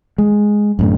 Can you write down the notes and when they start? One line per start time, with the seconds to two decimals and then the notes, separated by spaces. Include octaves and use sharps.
0.18 G#3
0.79 F#2 A2 D3